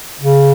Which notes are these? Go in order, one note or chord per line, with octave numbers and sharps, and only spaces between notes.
C#3